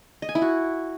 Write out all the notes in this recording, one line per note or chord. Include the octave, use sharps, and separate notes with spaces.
D#5
G#5
E4
F#4